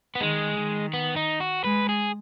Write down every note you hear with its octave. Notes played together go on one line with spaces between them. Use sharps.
B3
D#3 G#3
D#3
B3
D#4
F#4
G#3 B4
G#4